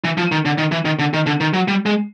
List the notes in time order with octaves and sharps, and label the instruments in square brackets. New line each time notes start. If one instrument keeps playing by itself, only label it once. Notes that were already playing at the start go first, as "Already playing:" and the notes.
[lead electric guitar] E3
F3
D#3
D3
D#3
E3
D#3
D3
D#3
D3
D#3
F#3
G3
G#3